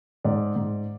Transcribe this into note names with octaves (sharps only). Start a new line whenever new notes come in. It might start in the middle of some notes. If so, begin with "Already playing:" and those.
G#2 D5
G#2